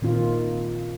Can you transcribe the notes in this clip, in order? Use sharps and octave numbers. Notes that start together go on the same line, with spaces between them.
A#2 D#3 C4 F4